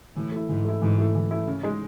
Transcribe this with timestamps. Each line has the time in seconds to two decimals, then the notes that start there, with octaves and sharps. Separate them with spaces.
0.16 A2 E3
0.32 A3 E4
0.49 G#2 E3
0.65 A3 E4
0.82 G#2 E3
0.98 A3 E4
1.15 E3
1.31 A3 E4
1.47 C#3
1.63 G#3 D#4